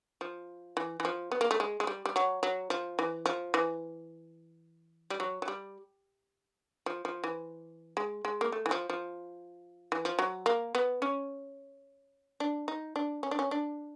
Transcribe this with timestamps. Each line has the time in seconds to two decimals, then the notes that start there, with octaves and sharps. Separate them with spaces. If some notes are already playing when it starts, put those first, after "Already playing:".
0.21 F3
0.77 E3
1.00 E3
1.05 F3
1.31 B3
1.41 A#3
1.51 A3
1.60 G#3
1.80 G#3
1.87 G3
2.05 G3
2.16 F#3
2.43 F#3
2.70 F3
2.99 E3
3.26 F3
3.54 E3
5.10 G3
5.20 F#3
5.42 F#3
5.48 G3
6.86 F3
7.05 F3
7.24 E3
7.97 G#3
8.25 G#3
8.41 A#3
8.52 A3
8.66 E3
8.71 F3
8.90 F3
9.92 E3
10.05 F3
10.19 F#3
10.46 A#3
10.75 B3
11.02 C#4
12.40 D4
12.68 D#4
12.96 D4
13.23 C#4
13.31 D4
13.39 C#4
13.51 D4